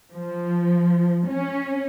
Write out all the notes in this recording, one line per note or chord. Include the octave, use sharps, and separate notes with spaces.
F3
C#4